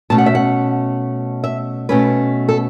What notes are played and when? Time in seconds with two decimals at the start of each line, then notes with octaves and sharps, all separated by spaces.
0.10 B2 A3 C#4 A5
0.18 F#5
0.26 E5
0.35 F#5
1.44 E5
1.89 B2 A3 C#4 B4
2.49 A4